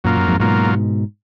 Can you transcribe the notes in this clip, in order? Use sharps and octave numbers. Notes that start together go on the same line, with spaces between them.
F#2 A#2 F#3 A#3 F4
F#2
F2 G#2
G#2 B2 F#3 A#3 F4